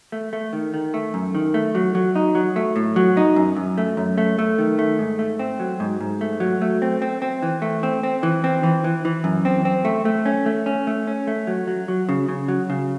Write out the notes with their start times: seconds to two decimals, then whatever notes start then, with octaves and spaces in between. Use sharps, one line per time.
0.12 A3
0.33 A3
0.53 D#3
0.74 D#3
0.94 A3
1.14 F#2
1.35 D#3
1.54 A3
1.75 F#3
1.95 F#3
2.15 D#4
2.35 F#3
2.56 A3
2.76 A2
2.96 F#3
3.17 D#4
3.36 F#2
3.57 F#2
3.78 A3
3.97 F#2
4.18 A3
4.39 A3
4.58 D#3
4.79 A3
4.99 G#2
5.19 A3
5.39 C4
5.60 F#3
5.80 G#2
6.01 G#2
6.21 A3
6.40 F#3
6.62 A3
6.82 C4
7.02 C4
7.22 C4
7.43 E3
7.62 A3
7.83 C4
8.03 C4
8.23 E3
8.44 C4
8.63 E3
8.84 E3
9.05 E3
9.24 F#2
9.45 C4
9.65 C4
9.85 A3
10.05 A3
10.26 C#4
10.46 A3
10.66 C#4
10.87 A3
11.07 C#4
11.27 A3
11.47 F#3
11.67 F#3
11.88 F#3
12.09 C#3
12.29 C#3
12.48 F#3
12.70 C#3